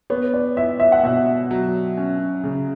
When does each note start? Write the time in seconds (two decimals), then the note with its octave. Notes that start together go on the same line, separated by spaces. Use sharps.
0.10 B3 C#5
0.34 D5
0.57 E4 E5
0.80 E5
0.92 F#5
1.03 B2 E5
1.51 F#3
1.97 C#4
2.44 C#3